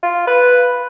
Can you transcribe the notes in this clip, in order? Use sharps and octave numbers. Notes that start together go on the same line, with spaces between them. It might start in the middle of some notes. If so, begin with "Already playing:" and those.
F4
B4